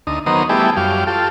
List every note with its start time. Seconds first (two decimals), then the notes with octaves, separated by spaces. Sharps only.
0.07 D2 D#4
0.26 D#3 F#3 B3 D#4 A#4 C5
0.49 G3 A3 B3 E4 G4 G#4
0.77 F#2 G3 G4 F5
1.07 F4 G4 A4